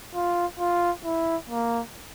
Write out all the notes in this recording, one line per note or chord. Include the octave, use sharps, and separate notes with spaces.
F4
F4
E4
A#3